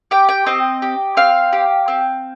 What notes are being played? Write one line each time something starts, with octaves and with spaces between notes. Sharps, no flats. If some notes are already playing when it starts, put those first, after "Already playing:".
G4 G5
G5
C4 D#5
G4
C4 F5
G4
C4